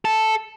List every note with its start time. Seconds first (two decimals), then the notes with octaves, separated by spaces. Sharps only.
0.05 A4